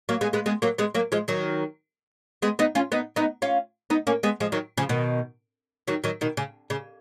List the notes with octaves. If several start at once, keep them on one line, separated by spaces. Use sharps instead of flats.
F#3 A#3
G#3 B3
G#3 B3
G#3 B3
F#3 A#3
G#3 B3
F#3 A#3
F3 G#3
D#3 F#3
G#3 B3
B3 D#4
C#4 F4
B3 D#4
B3 D#4
C#4 F4
B3 D#4
A#3 C#4
G#3 B3
F3 G#3
D#3 F#3
C#3 F3
B2 D#3
D#3 F#3
D#3 F#3
B2 D#3
C#3
C#3